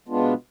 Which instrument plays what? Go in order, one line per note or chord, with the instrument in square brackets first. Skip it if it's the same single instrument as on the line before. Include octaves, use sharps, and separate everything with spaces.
[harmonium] B2 G#3 B3 D4 F4